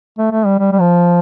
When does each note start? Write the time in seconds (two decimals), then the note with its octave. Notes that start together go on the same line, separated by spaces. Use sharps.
0.18 A3
0.32 A3
0.46 G3
0.59 G3
0.72 G3
0.80 F3